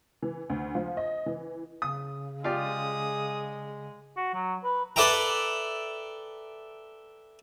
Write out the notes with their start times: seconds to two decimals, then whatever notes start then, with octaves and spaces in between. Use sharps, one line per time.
0.22 E3
0.50 D2
0.75 F3
0.97 D#5
1.26 E3
1.82 C#3 D#6
2.44 G#3 F4 G4 D5 D#6
4.16 F#4
4.34 F#3
4.64 B4
4.96 A4 B4 D5 E5 G5 A#5